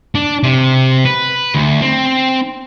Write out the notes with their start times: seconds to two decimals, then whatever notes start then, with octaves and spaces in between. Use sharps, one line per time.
0.15 D4
0.43 C3
1.05 B4
1.55 D2
1.82 C4